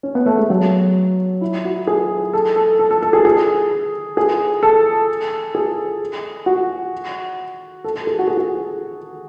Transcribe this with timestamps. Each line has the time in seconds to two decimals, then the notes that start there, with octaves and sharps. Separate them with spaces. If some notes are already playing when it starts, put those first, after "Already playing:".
0.03 C#4
0.15 B3
0.26 A3
0.38 G#3
0.50 F#3
1.41 E4
1.65 F#4
1.87 G#4
2.33 A4
2.56 A4
2.79 A4
2.91 A4
3.02 A4
3.13 G#4
3.25 G#4
4.17 G#4
4.63 A4
5.55 G#4
6.46 F#4
7.84 A4
7.95 A4
8.07 G#4
8.19 F#4
8.28 G#4
8.37 F#4